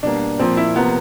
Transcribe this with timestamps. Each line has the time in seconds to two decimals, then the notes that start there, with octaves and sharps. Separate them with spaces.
0.03 B2 G3 A#3 D4
0.39 A#2 F3 A#3 C4
0.57 E4
0.75 C3 F3 A#3 B3